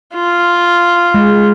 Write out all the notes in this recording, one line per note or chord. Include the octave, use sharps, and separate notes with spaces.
F4
G#3